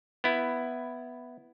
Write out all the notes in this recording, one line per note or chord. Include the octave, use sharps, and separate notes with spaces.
B3 E4